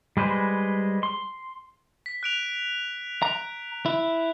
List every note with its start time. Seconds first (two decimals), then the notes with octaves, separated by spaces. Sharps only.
0.17 G3 G#3 B4 C5
1.03 C6
2.06 B6
2.23 F#6 D7 F7
3.22 A#5
3.86 E4